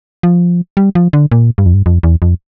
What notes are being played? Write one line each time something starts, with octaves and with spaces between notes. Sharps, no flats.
F3
G3
F3
D3
A#2
G2
F2
G2
F2
E2
F2